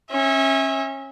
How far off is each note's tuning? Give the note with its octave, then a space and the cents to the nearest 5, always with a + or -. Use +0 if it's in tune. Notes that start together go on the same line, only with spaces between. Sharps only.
C#4 -30 E5 -25